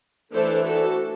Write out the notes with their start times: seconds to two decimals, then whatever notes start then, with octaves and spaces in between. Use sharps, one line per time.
0.33 E3 A3 D4 A4 C5
0.66 F#4 A4